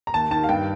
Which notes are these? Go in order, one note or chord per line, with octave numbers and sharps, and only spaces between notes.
A#5
D#2 A5
D#3 A5
F5
G2 G5